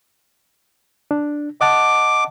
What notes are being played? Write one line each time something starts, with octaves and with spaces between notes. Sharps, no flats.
D4
D#5 F#5 A5 D6